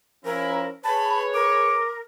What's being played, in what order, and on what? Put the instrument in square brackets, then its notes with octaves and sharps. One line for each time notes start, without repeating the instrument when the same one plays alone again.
[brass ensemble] F3 C#4 E4 [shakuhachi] A#4
[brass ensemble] G#4 B4 C#5 [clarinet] A5 [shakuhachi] B5
[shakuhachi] A#4 [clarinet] D6